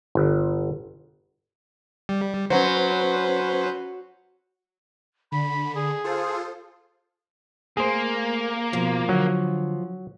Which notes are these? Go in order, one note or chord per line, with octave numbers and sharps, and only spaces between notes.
G1
G3
F#3 C#4 B4 C5
D3 B5
G#4
F4 A4 C5
A3 A#3 G#4 C5
B2 F3
D3 F#3